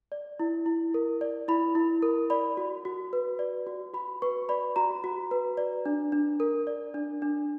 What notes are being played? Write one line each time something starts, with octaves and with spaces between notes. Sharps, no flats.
D5
E4
E4
A#4
D5
E4 B5
E4
A#4
D5 B5
F#4
F#4
B4
D5
F#4
F#4 B5
B4 C#6
D5 B5
F#4 A#5
F#4
B4
D5
D4
D4
A#4
D5
D4
D4